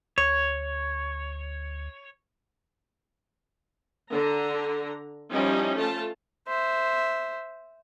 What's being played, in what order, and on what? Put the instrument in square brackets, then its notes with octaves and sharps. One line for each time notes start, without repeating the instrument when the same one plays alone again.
[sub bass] D2 [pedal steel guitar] C#5
[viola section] D3 A#5
F3 G3 C#4 D#4 E4
A3 F4 A5
[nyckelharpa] C5 E5